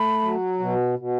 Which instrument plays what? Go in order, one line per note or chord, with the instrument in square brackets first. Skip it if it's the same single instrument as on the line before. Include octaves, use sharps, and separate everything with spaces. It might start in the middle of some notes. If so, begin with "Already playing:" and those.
Already playing: [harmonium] A3 [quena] B5
[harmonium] F#3
B2
B2